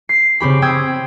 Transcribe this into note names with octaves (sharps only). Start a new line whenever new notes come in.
C7
C#3 C4 G4 B5
C4 G5 D#6 E6 G#6